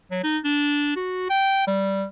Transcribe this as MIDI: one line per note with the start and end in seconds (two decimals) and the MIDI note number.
0.11 0.20 54
0.24 0.38 63
0.44 0.95 62
0.96 1.25 66
1.30 1.66 79
1.67 2.05 55